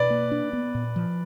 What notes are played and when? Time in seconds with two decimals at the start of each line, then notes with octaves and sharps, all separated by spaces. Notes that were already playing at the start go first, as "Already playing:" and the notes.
Already playing: B2 B4 D5
0.10 A#3
0.31 D4
0.53 B3
0.75 A#2
0.96 F3